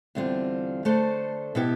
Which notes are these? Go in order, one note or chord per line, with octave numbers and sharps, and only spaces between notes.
E2 D3 G3 C4 F4
D3 A3 D4 A4 C5
B2 B3 E4 G4